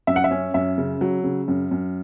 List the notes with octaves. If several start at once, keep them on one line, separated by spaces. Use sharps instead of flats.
F#2 E5
F#5
E5
C#4
F#2 E5
C#3
F#3
C#3
F#2
F#2